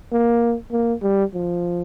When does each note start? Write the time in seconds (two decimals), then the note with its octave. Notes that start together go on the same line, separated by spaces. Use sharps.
0.12 A#3
0.72 A#3
1.02 G3
1.34 F3